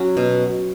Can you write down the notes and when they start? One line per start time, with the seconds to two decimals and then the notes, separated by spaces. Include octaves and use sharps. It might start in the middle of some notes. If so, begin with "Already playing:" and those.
Already playing: F#3 C#4
0.17 B2